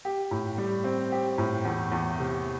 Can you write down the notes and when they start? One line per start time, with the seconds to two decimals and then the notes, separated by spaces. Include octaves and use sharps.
0.05 G4
0.31 A2
0.58 G3
0.84 C4
1.12 G4
1.38 A2
1.65 E2
1.92 E2
2.18 C3